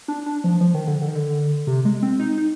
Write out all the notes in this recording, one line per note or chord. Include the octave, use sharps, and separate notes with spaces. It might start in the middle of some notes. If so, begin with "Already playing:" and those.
D4
D4
F3
F3
D#3
D3
D3
D#3
D3
C3
G#3
C4
D#4
D#4